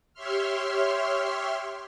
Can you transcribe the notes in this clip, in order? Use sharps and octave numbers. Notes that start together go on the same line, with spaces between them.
G4 C#5 E5 C6 F6